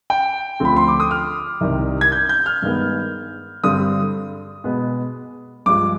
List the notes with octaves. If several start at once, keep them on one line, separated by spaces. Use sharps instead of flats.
G5
D2 D3 F3 C4 B5
C6
D6
D#6
F6
C2 C3 D#3 G3
G#6
G6
G6
F6
G2 D#3 G#3 B3
G2 D3 G3 C4 D#6
B2 G#3 B3
G2 F3 G#3 D6